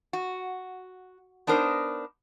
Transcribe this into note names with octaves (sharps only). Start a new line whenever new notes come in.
F#4
B3 D4 D#4 A#4 C5